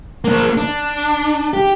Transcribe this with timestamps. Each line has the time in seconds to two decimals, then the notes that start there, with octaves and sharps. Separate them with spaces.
0.24 A#3 D4
0.57 D4
1.53 G4